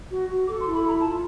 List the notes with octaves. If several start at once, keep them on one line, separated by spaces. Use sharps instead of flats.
F#4
F#4
A4 D6
C6
E4
B5
A4 A#5
F4 A5